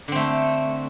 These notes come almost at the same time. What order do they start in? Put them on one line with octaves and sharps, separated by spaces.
D3 C4 A3